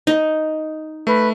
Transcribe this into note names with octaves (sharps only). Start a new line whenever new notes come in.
D#4
A3 B4